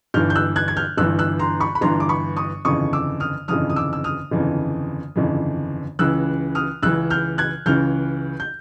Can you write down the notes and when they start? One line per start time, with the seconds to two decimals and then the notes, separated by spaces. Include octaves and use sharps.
0.14 G1 G2 E3 F6 G6
0.30 G6
0.36 E6 F#6
0.56 F#6 G#6
0.68 G#6
0.77 F6 G6
0.97 G1 G2 E3 E6 F#6
1.19 E6 F#6
1.39 A#5 C6
1.60 B5 C#6
1.75 B5
1.81 G1 G2 E3 A#5 C6
2.00 D6
2.09 B5 C#6
2.36 C#6 D#6
2.65 G1 F2 C#3 E3 C#6 D#6
2.93 D6 E6
3.20 D#6 F6
3.48 G1 F2 C#3 E3 D#6 F6
3.70 D#6
3.76 D6 E6
3.93 E6
4.04 D#6 F6
4.31 G1 F2 C#3 E3
5.16 G1 F2 C#3 E3
5.99 C#2 C#3 E3 E6 F#6
6.55 D#6 F6
6.82 C#2 C#3 E3 E6 F#6
7.10 F6 G6
7.38 F#6 G#6
7.66 C#2 C#3 E3 F6 G6
8.40 G6